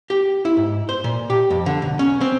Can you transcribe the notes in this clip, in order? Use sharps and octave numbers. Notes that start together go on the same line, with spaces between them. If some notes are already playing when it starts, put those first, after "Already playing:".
G4
E4
G#2
C5
A#2
G4
F2
D3
B1
C#4
C4